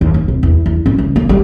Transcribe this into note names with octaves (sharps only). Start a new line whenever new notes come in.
D#2
D#2
C3
E2
E2
C#4
C#2
A#3
G3